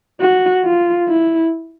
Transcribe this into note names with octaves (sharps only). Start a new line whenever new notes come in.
F#4
F4
E4